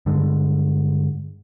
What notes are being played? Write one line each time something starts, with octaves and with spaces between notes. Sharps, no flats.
G2 D3 G#3